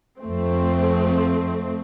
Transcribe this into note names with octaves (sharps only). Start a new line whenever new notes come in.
F2 F3 A3 C4